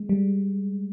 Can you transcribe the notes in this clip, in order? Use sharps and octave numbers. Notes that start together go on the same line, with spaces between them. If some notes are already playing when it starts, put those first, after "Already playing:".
Already playing: G#3
G3